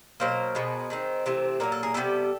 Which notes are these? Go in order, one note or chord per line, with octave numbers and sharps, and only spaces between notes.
B2 F#3 A#3 A#4 C5
B2 G#3 B3
D#3 G#3 C4
C3 E3 A3 C4
A#2 F#3 A#3 A#4
A4
G#4 A#4
C3 E3 G3 B3 G4 A4